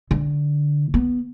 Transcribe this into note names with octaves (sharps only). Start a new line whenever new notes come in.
D3
B3